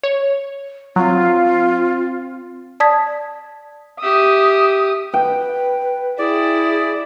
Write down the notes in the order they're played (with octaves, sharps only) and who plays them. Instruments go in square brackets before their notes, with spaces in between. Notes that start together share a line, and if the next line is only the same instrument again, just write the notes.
[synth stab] C#5
[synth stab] F#3 [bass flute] C4 [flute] F4
[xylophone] D5 A5 D#6 G#6 B6
[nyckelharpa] G4 E5 [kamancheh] D#6
[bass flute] B4 [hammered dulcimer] G5
[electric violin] E4 [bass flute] G#4 [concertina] D5